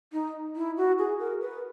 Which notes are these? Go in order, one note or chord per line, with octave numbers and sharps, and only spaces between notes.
D#4
E4
F#4
G#4
A#4
B4